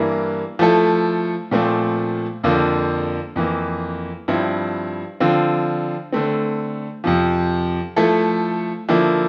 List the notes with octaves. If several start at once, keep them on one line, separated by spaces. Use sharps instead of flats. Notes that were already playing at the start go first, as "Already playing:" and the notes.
Already playing: G2 E3 A#3 E4 A#4
F3 A3 E4 A4
A#2 F3 A3 C4
F2 D3 F3 A#3
F2 E3 A#3
G2 F3 C4 E4
D3 F3 C4 F4
D3 A3 C4
F2 C3 F3
F3 A3 E4 A4
D3 F3 A#3 E4